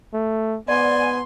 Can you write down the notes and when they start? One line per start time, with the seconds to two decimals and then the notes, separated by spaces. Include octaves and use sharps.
0.14 A3
0.68 G#2 B3 D5 G#5 C6